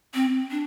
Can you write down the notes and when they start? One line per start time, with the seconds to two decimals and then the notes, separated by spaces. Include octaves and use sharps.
0.14 C4
0.51 D4